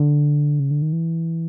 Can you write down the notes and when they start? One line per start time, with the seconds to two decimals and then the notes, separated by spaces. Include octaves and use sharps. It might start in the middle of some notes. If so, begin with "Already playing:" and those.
Already playing: D3
0.60 C#3
0.71 D3
0.82 D#3
0.93 E3